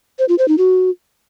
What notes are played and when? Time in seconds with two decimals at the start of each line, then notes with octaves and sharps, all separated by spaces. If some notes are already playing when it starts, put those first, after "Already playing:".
0.19 C5
0.29 F4
0.38 C5
0.48 D#4
0.58 F#4